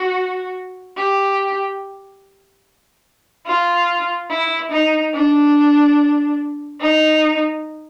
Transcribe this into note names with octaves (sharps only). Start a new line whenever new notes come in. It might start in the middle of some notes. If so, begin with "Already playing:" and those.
Already playing: F#4
G4
F4
E4
D#4
D4
D#4